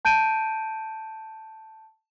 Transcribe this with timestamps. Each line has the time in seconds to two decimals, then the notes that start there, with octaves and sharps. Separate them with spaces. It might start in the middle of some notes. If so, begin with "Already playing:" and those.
0.05 A5 G6 D7 D#7